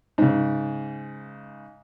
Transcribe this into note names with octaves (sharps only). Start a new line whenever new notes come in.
G#2 C#3